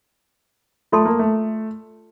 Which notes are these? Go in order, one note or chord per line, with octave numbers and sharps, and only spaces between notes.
A3 F4 A4 D5 A5 C6
A#3
A3